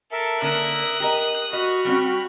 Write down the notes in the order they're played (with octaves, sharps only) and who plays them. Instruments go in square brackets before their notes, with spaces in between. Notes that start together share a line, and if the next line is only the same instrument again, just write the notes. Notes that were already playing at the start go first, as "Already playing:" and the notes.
[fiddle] A4 [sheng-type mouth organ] A#4 E5
[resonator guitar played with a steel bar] D3 A#3 C#4 [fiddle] D#6 F#6
[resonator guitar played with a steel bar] G4 A#4 D#5
[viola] F#4 [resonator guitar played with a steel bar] D#5 [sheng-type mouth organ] B5 F6
[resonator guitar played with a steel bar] G3 C4 C#4